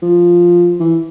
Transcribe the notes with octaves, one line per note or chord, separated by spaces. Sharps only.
F3
E3